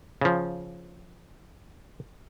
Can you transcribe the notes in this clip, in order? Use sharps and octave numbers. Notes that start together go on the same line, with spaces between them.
C#3 F3